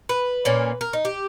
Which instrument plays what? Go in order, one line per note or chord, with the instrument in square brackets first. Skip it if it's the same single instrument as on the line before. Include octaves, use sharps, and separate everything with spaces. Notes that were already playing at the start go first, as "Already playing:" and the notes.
[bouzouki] B4
A#2 A#3 C#4
A#4
D#4
G4